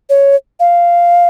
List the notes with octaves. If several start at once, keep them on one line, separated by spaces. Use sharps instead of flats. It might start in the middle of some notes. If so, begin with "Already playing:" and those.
C#5
F5